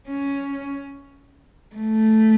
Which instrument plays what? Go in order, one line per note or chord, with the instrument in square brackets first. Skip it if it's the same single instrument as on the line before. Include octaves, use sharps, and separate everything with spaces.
[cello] C#4
A3